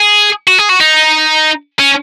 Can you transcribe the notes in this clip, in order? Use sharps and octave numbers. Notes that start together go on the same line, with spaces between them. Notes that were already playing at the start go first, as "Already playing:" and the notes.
Already playing: G#4
F#4
G#4
F#4
D#4
C#4